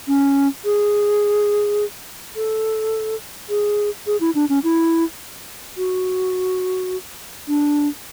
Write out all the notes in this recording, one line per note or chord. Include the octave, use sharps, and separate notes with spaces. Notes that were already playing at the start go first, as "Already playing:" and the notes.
C#4
G#4
A4
G#4
G#4
E4
D4
C#4
E4
F#4
D4